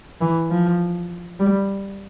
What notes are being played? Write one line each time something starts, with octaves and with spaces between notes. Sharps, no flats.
E3
F3
G3